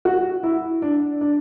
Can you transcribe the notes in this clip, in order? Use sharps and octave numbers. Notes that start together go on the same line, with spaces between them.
F#4
E4
D4
D4